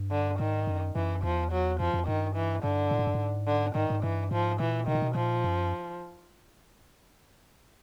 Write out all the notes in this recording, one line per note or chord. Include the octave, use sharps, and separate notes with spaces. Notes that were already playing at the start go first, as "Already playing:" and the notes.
Already playing: G2
D3
G#2 D#3
F#2
F#2 E3
E2 F3
F#3
F2 F3
F2
G2 D#3
E3
G2 D3
A2
G#2
G2
G#2
D3
G#2 D#3
G#2
G2 E3
G#2 F3
A#2 E3
B2 D#3
A#2
B2
A#2 F3
F#2